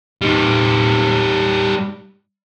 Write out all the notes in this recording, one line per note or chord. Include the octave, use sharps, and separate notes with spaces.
G3 D#4